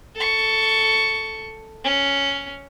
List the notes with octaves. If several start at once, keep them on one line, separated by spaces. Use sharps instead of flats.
A4 C#6
C#4